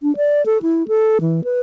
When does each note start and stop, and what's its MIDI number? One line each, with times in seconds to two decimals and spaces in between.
0.03 0.15 62
0.16 0.44 74
0.46 0.58 69
0.62 0.87 64
0.88 1.18 69
1.21 1.44 52
1.44 1.61 71